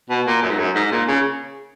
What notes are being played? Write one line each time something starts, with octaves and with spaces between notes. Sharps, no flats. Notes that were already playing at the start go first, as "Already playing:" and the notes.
B2
A#2
F#2
G#2
F#2
G#2
A#2
C#3